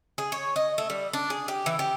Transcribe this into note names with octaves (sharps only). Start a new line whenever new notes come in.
G#4
C#5
D#5
A3
G3
D4
G#4
G4
E3
G4